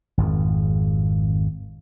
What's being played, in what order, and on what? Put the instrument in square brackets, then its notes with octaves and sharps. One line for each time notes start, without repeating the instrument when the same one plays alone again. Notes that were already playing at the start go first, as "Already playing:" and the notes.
[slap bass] G#1 F2